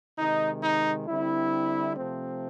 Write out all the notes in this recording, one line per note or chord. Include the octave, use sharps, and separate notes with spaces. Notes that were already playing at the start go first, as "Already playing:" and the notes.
C3 D#3 G#3 D#4
D#4
D3 G3 C4 E4
C3 F3 A3 C4